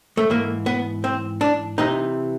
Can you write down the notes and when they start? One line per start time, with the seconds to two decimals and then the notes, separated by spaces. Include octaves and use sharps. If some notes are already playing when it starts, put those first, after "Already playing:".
0.17 A3
0.30 G#2 E3 A#3
0.66 B3
1.04 C4
1.41 D4
1.78 C3 E3 D#4